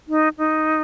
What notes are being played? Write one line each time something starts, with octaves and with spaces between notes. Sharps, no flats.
D#4
D#4